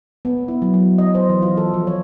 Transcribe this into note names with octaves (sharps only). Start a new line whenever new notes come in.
B3
E4
F#3
F#3
D#5
C5
E3
F4
A4
F3
C#5